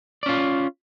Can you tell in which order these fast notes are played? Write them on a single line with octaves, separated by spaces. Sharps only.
D5 C#4 F4